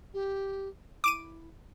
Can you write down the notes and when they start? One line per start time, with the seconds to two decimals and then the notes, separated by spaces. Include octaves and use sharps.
0.13 G4
1.04 E4 D6 D7 D#7